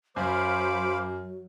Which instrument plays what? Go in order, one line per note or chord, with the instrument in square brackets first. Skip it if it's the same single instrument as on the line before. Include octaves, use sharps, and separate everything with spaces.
[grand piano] F#2 [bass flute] F#3 [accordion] C5 F5 B5 [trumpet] D6